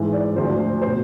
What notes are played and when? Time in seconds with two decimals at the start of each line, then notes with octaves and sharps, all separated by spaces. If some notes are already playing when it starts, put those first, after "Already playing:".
Already playing: G#2 E3
0.13 D5
0.36 D2 D3 F3 C5
0.82 C5
0.86 B2